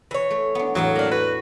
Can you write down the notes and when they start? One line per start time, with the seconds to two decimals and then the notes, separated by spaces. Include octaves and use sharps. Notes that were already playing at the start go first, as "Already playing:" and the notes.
0.11 E3 C#5
0.30 A3
0.55 B3 D4
0.75 E2 A2 F#3 F5
0.96 A#3 D4
1.11 F#4 B4